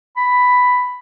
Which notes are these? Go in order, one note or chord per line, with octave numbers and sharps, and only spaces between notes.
B5